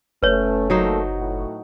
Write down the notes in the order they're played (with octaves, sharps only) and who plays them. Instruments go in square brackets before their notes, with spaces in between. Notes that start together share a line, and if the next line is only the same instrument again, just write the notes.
[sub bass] F#1 [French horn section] A3 C#4 [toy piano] B4 C#5
[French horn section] A#2 A3 A4 [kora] F#3 D#4 C5
[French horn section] A2 F#4